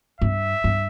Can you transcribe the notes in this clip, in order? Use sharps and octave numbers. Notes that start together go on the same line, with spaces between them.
G2 E5
G2